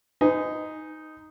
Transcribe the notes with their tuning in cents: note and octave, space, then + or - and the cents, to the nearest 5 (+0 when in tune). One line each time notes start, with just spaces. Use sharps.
D#4 +0 B4 +45 G#5 +0